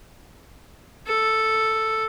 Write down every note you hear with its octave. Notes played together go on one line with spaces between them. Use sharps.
A4